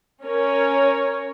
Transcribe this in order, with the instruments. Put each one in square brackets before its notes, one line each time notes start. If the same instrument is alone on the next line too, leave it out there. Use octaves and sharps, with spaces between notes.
[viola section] C#4 A#4 C#5